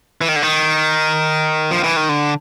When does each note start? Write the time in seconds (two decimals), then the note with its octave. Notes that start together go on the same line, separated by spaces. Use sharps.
0.21 E3
0.28 D#3
0.36 D3
0.43 D#3
1.71 F3
1.83 E3
1.96 D#3
2.09 D3